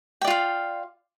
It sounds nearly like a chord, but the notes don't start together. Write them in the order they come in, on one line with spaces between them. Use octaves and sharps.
G5 D5 F4 F5